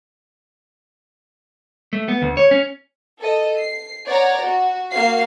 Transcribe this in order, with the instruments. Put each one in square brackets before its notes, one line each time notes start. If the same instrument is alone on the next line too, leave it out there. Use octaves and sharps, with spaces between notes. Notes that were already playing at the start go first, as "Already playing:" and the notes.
[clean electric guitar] A3
B3
D2
C#5
C#4
[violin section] A4 D#5
C7
C#5 D5 F#5 A#5
F#4
A#3 F#4 F5 C7